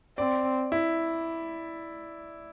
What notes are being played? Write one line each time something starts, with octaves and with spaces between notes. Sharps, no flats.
C4 D5
E4